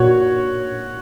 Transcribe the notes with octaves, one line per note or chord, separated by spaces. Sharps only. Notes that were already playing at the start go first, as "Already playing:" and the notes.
Already playing: A#2 F#4 C#5